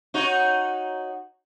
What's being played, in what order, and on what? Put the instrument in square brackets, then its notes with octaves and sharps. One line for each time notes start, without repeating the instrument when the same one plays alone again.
[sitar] D#4 F#4 C#5